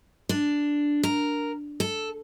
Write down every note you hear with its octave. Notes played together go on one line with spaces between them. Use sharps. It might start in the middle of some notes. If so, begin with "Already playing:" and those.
D4
A#4
A4